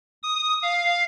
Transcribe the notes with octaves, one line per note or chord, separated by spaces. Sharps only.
D#6
F5